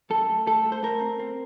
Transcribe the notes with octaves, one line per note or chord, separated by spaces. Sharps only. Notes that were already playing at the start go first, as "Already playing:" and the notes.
F#2 A4
A3
A3 A4
A3
C5
A3 A#4
C4
C4